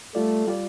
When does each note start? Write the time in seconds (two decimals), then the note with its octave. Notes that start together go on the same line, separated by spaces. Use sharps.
0.15 G3 A3 F4 D5
0.47 G3 F4 D5